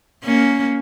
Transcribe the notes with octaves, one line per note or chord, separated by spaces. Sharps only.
A#3 C#4